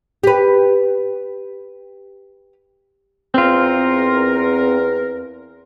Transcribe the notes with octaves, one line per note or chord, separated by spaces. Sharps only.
G4 B4
E2 C4 F4 A#4